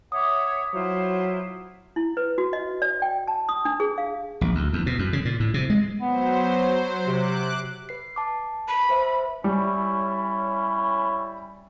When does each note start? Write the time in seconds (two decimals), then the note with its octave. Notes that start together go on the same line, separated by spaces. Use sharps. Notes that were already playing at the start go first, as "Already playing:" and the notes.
0.12 C#5 E5 F#5 D6 D#6
0.74 F#3 E4 F4 C5
1.96 E4
2.17 B4
2.38 F#4
2.53 D#5
2.82 D5
3.02 G5
3.28 A5
3.49 D#6
3.65 D4
3.80 G#4
3.98 F5
4.41 A#1
4.55 D2
4.73 E2
4.86 B2
4.99 F#2
5.13 C#3
5.25 A#2
5.40 A2
5.54 C3
5.70 G#3
6.01 F#3 B3 C5
7.07 C3 D6 F#6
7.89 B4 C7
8.16 A5 D6
8.68 B5
8.89 B4 C5 E5
9.44 G3 C#4 E4 C#5